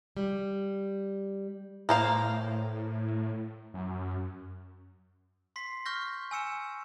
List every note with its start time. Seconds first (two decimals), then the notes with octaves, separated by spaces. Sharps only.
0.17 G3
1.89 A2 A#3 C5 F5
3.74 F#2
5.56 C6 B6 C7
5.85 C#6 F6 G6 A#6
6.31 G#5 E6 C#7 E7